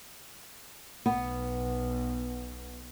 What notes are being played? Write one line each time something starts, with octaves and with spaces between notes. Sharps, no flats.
B1 B2 B3